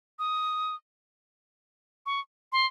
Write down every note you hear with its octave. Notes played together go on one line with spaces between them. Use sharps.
D#6
C#6
C6